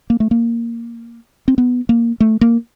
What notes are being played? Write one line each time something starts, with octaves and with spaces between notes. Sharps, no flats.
A#3
A3
A#3
C4
B3
A#3
A3
A#3